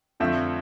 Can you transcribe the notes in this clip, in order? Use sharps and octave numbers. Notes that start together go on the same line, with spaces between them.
F2 D3 F3 A3 C4 E5